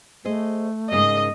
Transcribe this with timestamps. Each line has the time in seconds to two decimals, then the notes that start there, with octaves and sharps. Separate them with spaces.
0.25 A3 G#4 C5 D#5
0.92 G#2 C#3 A#3 D#5